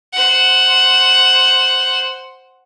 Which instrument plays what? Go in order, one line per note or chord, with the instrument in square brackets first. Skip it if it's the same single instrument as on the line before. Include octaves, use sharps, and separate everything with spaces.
[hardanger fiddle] C5 F#5